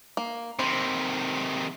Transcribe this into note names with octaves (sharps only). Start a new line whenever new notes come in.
A#3
C3 D#3 C5 B5